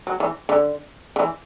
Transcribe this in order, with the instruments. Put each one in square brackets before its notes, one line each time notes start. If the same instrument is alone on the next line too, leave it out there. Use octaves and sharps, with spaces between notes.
[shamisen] F#3
E3
D3
D3
E3